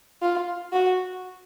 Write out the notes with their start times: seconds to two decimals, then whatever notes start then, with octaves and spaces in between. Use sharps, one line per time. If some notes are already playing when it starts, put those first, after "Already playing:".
0.22 F4
0.73 F#4